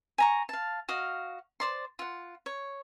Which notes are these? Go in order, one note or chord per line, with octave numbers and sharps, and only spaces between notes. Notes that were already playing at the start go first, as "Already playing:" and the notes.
G#5 A#5 C#6
F5 A5
F#4 D#5 F5
C5 D5 C6
F4 F#5
C#5